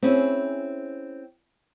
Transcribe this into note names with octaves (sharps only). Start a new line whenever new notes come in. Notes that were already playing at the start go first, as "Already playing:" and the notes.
C4 C#4 E4 G#4